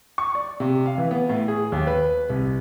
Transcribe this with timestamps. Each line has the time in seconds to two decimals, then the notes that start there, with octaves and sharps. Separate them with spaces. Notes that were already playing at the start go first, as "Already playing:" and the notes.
0.18 C#6
0.35 D5
0.60 C3
0.86 F5
0.98 E3
1.11 B3
1.29 A2
1.48 G#4
1.72 D#2
1.87 B4
2.30 C2